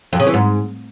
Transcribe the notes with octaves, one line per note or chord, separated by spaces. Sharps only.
F2
C#3
E3
G#2